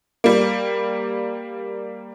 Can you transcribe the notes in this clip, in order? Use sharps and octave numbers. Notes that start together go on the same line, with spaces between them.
G3 A#3